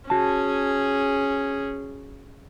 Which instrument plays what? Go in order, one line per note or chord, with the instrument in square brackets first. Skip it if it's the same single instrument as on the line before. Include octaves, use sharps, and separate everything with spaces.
[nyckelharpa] C#4 G#4 [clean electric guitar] F#4 A5